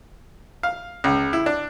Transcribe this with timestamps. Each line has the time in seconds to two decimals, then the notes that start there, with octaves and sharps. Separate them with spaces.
0.63 F5
1.04 C#2
1.33 E4
1.46 D4